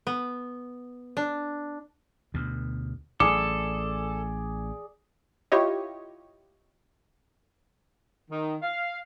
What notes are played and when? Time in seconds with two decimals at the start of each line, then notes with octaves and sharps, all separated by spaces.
0.07 B3
1.17 D4
2.34 D2 B2
3.20 A1 G#4 A4 D5 D6
5.52 E4 F4 G4 C#5 D#5
8.30 D#3
8.62 F5